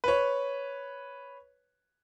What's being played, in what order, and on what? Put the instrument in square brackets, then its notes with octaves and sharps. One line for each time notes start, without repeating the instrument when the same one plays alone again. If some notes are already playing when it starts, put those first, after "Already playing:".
[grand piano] B4 C#5